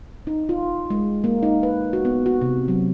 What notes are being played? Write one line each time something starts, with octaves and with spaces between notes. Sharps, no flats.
D#4
F4
G#3
A#3
D#4
B4
F#4
B3
F#4
C3
F#3